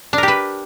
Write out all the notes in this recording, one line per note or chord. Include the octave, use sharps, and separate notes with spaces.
D4 G4 A#4 B4